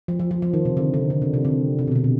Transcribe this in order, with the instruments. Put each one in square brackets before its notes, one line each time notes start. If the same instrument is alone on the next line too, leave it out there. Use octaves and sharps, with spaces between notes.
[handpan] F3
F3
F3
F3
D#3
C3
D3
D3
D3
C3
C3
D3
C3
B2
D3
C3
B2